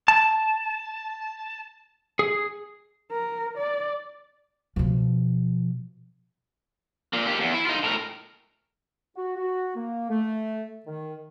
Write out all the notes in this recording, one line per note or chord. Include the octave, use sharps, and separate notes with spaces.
A5
G#4
A#4
D5
B2 F3
A#2 A#3
A#3 G4
E2
E4
D#4 F4
A2 A#4
F#4
F#4
A#3
A3
D#3